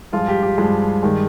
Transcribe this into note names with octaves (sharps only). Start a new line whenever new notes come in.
G2 F3 G#3 F4
G4
G4
G2 F3 G#3
G2 D#3 G#3